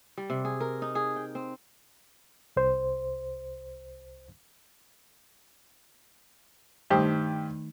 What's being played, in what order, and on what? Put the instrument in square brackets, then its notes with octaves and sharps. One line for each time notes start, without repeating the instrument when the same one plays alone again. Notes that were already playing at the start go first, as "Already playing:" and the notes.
[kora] G3
C3
G#4
A#4
D#4
G#4
G5
C4
[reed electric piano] C2 C5
[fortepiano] G2 G4 C5 [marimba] D#3 A3 D#4